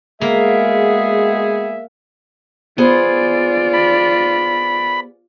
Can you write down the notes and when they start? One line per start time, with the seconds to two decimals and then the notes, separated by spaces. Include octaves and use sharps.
0.21 G#3 A#3 B3 F#4 G#4 E5
2.78 B3 F4 G#4 C5 D5
3.73 B5